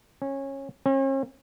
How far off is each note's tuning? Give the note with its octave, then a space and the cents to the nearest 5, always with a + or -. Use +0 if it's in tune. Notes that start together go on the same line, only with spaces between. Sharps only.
C#4 -20
C#4 -45